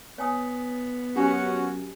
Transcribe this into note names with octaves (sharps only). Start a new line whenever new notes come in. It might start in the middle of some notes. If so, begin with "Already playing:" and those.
B3 C#5 G#5 D#6
F#2 C#4 F#4 G4 G#5